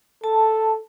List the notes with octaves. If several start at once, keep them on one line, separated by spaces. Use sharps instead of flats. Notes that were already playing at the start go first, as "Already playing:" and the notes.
A4 A5